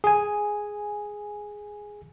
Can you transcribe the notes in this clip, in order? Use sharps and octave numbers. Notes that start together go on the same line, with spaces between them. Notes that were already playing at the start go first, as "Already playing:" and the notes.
G#4 G#5